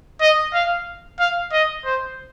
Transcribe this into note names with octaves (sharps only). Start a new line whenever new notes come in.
D#5
F5
F5
D#5
C5